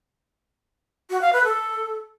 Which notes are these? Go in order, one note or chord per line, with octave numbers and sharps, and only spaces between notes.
F#4
F5
B4
A4